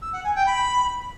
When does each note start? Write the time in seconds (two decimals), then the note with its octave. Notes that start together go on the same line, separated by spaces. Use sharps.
0.02 E6
0.13 F#5
0.24 G#5
0.35 G5
0.46 B5